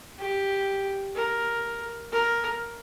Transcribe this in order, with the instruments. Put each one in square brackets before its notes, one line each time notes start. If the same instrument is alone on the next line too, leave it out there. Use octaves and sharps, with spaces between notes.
[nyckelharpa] G4
A#4
A#4